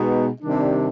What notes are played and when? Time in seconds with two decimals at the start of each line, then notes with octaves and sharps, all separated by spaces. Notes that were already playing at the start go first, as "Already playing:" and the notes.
Already playing: B2 G#3 B3 D#4
0.41 C3 D#3 G3 D4